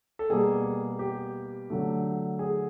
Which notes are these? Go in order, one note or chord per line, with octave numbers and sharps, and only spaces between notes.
A4
B2 G3 A#3 G#4
G4
D3 F#3 A3
G#4